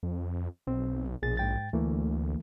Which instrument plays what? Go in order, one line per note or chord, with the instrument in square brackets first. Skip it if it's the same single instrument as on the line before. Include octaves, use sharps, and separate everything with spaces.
[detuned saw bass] F2
[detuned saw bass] B1 [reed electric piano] B2 C4
[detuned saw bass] A#1 [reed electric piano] B2 G#4 A6
[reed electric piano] G#2 G5 A6
[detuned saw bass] D2 [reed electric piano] E3 A3 A#3